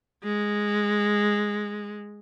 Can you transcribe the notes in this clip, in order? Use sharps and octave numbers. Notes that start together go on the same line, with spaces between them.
G#3